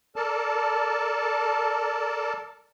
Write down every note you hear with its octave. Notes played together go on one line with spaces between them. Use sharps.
A4 A#4 D5 A5